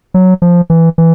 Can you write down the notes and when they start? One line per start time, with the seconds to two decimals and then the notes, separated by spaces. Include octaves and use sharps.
0.14 F#3
0.42 F3
0.70 E3
0.98 E3